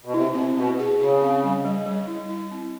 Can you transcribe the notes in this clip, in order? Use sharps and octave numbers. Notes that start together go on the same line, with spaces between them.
B2
C3 E4
C4
B2 C4
G#4
C#3 G#4
C4
G3
G3
G3
E4
E4
C4